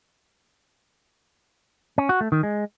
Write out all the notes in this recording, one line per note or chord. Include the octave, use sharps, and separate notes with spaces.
C#4
F#4
A3
D#3
G#3